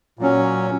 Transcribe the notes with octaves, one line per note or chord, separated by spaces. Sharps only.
A#2 F#3 C#4